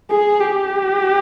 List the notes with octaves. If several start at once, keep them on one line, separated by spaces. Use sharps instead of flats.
G#4
G4